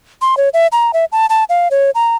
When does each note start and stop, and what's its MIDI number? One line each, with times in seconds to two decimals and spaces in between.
0.22 0.37 84
0.37 0.49 73
0.54 0.67 76
0.72 0.91 82
0.93 1.05 76
1.12 1.26 81
1.30 1.44 81
1.49 1.68 77
1.71 1.90 73
1.95 2.16 82